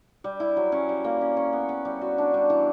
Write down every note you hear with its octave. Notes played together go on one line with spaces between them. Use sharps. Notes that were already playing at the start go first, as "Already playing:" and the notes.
G3
E4
F#3
C#4
G3
A#3
C#4
C#4
B3
B3
G3
F#4
D4
G3
E3